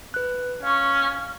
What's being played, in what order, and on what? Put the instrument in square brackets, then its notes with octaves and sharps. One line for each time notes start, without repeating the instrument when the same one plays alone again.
[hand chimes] B4 F#6
[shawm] C#4 [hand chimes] F5 C#6